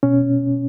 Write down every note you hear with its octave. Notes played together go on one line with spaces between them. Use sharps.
B2 C#4